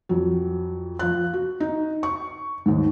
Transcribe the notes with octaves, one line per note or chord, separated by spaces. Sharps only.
F2 F#3
F3 F#6
F#4
D#4
C#6
D#2 G#2